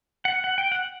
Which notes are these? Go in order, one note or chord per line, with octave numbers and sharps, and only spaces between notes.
F#5
F#5
G5
F#5